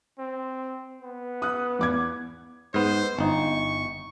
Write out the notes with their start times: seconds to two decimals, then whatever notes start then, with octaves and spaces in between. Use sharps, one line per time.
0.19 C4
1.02 B3
1.42 D#6 F#6
1.79 E2 D6 G#6
2.74 G#2 B3 C5
3.19 G1 D#4 C#6